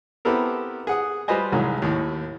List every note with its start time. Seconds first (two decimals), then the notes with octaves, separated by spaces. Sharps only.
0.25 B3 C4 E4 G4 A4 A#4
0.87 G#4 F#5 D#6
1.28 G3 F4 B4 C5 D#5 G#5
1.52 C2 A2 D#3 E3 F#3 G#3
1.82 D#2 A2